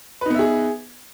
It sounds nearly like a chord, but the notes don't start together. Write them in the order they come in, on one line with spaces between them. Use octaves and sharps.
B4 D#4 B3 E5 G#4